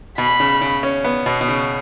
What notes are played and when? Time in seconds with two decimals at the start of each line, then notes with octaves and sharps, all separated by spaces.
0.18 B2 B5
0.40 C#3
0.61 C#3
0.83 C#4
1.04 B3
1.26 B2
1.41 B2
1.48 C#3